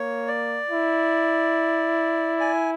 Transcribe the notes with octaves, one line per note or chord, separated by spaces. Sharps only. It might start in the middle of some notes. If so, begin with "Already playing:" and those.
Already playing: A#3 C#5
D5
E4
G#5